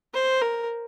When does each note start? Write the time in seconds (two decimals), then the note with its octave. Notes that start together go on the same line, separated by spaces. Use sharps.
0.14 C5
0.41 A#4